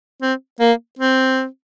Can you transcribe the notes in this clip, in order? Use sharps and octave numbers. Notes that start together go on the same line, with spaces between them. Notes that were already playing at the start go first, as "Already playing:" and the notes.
C4
A#3
C4